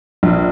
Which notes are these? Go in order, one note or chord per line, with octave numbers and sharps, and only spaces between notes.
A#1